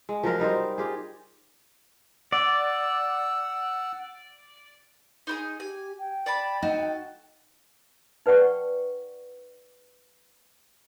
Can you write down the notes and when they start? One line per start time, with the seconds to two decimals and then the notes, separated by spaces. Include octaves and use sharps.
0.09 G#3
0.23 F3 F#3 A#4 F5
0.39 G3 D#4 A#4 C5
0.78 F4 G4 G#4
2.32 D5 F#5 E6
5.27 D#4 E4 G#4
5.60 G4 G#5
5.99 G5
6.26 D5 A5 B5
6.63 D#4 F#4 A4
8.26 D#4 B4 D5 F#5 G5 C#6